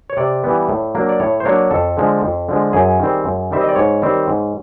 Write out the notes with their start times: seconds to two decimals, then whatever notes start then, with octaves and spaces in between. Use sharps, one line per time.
0.10 C#5
0.17 C3 D5
0.44 E3 G3 B3
0.69 A2
0.95 F#3 A#3 D4
1.09 D5
1.20 A2 C#5
1.40 C5
1.45 F#3 A#3 D4 C#5
1.71 F2 A4
1.97 D3 F3 G#3
2.22 F2
2.49 D3 F3 G#3
2.73 F#2 G#4
2.99 D#3 G3 C4
3.24 F#2
3.51 D#3 G3 C4 E5
3.61 D#5
3.69 D5
3.76 G#2 C#5
4.02 D#3 G3 C4
4.28 G#2